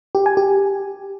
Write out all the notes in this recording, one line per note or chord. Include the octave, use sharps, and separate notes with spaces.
G4
G#5
G4